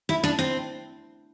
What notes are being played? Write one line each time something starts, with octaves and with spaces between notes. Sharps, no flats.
E4
D4
C4